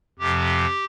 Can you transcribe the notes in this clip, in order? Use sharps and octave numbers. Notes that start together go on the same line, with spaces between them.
F2 C3 F3 G4